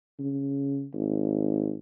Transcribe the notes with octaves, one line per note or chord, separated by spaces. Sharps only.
C#3
G#1